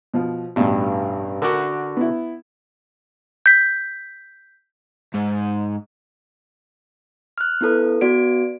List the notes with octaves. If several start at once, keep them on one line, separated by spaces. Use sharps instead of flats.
B2 F3
A1 G2 B2
D3 F#4 A#4 D6
B3 E4
G6 B6
G#2
F6 F#6
B3 E4 A4 B4
B3 F#4 D5 D7